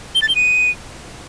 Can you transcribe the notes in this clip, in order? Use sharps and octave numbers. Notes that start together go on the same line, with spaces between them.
G7
A6
G7
D#7